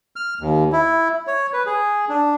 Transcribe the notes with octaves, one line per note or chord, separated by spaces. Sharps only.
F6
D#2
E4
C#5
B4
G#4
D4